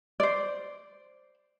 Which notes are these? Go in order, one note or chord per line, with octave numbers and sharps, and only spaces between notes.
C5 D5